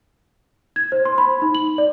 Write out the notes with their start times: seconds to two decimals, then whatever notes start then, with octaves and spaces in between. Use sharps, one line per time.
0.76 G#6
0.92 C5
1.05 C6
1.18 B5
1.42 D#4
1.55 F#7
1.78 D5